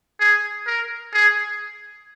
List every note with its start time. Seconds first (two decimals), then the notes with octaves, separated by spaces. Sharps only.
0.20 G#4
0.67 A#4
1.13 G#4